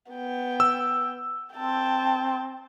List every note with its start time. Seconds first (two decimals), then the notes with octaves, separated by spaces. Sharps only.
0.12 B3 G5
0.60 E6
1.56 C4 G5 A5